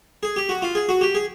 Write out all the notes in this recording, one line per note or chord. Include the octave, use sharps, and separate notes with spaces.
G#4
G4
F#4
F4
G#4
F#4
G4
G#4